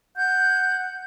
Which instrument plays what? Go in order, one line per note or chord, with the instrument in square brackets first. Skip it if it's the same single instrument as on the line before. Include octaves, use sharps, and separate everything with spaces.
[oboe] F#5 [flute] G6